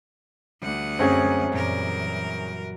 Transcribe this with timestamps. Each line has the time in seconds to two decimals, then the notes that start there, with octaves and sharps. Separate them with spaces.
0.62 D2 G3 F#5
0.99 F#2 A#3 C4 C#4 G#4
1.52 F#2 A#2 E3 G3 A#4